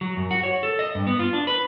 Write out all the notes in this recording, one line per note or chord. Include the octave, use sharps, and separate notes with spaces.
F#3
F#2
F#4
C#5
A4
D#5
G2
B3
F4
D4
B4